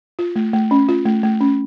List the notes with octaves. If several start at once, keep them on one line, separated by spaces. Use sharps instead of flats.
F4
A3
A3
C#4
F4
A3
A3
C#4